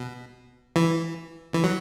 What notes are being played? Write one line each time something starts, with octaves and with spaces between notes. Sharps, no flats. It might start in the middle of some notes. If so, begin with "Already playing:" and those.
Already playing: B2
E3
E3
F#3